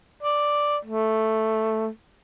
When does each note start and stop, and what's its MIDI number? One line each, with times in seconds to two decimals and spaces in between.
0.23 0.77 74
0.85 1.88 57